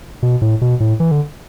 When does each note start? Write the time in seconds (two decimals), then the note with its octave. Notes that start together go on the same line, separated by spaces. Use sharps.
0.23 B2
0.42 A2
0.61 B2
0.80 A2
1.00 E3
1.11 D3